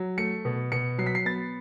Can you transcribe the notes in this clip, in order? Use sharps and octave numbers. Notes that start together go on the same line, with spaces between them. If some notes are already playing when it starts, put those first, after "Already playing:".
Already playing: F#3
A3 C#7
B2
B2 C#7
F#3 C7
B6
C7
B3 A6